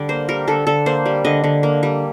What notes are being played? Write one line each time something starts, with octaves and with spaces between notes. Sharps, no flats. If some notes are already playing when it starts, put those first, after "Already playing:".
Already playing: D3 G3 D5
A#3 C5
G3 A#4
D3 A4
D3 A4
A#3 C5
G3
D3 D#5
D3
A#3
G3